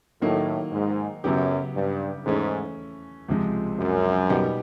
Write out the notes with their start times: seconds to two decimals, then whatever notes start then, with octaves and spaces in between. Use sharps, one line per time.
0.22 A2 D#3 F#3 A#3 D#4
0.72 G#2
1.23 F#2 C#3 F#3 B3 E4 G4
1.75 G2
2.25 G#2 E3 A3 C#4
3.28 C#2 C3 F3 G#3
3.79 F#2
4.30 B2 G3 B3 D#4 G4